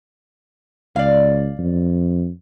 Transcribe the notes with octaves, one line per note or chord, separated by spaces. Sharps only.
C#2 D5 F5
F2